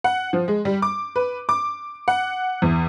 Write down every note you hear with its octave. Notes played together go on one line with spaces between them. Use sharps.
F#5
F3
G#3
G3
D6
B4
D6
F#5
E2